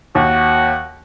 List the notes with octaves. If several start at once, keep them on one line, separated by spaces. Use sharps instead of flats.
D#2 F#4